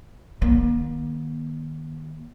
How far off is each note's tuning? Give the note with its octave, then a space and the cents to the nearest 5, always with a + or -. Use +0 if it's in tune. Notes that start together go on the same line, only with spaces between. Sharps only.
D#3 -15 A#3 +35